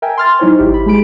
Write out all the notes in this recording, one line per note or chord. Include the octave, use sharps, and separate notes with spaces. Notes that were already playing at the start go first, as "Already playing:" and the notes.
A#4 E5 G5 G#5
C6 F6 A6
F#3 D#4 E4 C5 C#5
G#1 E4 G4
B5
G#3 G#4 B5 D7